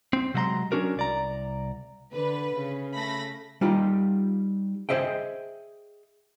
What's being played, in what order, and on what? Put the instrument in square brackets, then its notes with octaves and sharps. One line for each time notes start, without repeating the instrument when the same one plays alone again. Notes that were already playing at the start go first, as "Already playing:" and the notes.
[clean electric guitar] C4
C3 F#3 G#3 D#5 A#5 C6
F#3 C#4 D4 F#4 A#4
C2 D5 A#5
[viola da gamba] D3 [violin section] B4
[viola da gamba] C#3
[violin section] A3 B5 A#6
[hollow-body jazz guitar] G3 D#4 F4 G4
G#4 A#4 C5 D#5 E5 G5